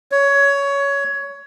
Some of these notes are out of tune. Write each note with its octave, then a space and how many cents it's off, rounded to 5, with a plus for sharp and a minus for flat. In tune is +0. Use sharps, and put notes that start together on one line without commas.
C#5 +15